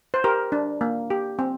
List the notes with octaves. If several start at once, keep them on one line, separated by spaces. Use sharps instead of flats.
C5
G4 A#4
D4
A#3
G4
C4